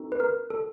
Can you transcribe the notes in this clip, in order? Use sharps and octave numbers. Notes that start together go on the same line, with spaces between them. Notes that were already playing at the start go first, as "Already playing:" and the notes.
Already playing: C4 D#4 F#4 A4
B4
A#4
A4